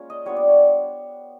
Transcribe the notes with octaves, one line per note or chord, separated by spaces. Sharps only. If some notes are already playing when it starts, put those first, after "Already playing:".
Already playing: G#3 A#3 C#4 F4 C#5
D#5
G3 B3 D4 F4 C#5
D5
C#5